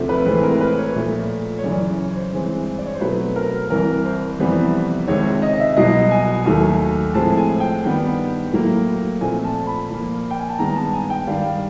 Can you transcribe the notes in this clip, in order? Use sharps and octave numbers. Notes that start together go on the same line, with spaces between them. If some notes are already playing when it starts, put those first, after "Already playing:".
Already playing: D2 C3 F3 A3
B4
A2 E3 G#3 C4 B4
A#4
B4
C#5
A#2 F3 A3
C#5
F#2 C#3 E3 D5
C#5
C5
G2 E3 G#3 C4
D5
C#5
C5
B2 F#3 A3 C4 B4
A#4
C2 C3 E3 A#4
C5
F2 C3 E3 G3 B3
C#2 C3 D#3 G#3 C4 C#5
D#5
E5
C2 B2 F#3 D#5
G#5
D#2 D#3 F#3 A3
A2 F3 G#3 C4 A5
G#5
G5
G2 D#3 G3 B3
A2 F#3 A#3
A#2 F3 A3 C4 G#5
A5
B5
A#2 F3 A#3
G5
G#5
A5
G2 D#3 G#3 B3 A#5
A5
G#5
G5
G2 D#3 G3 F5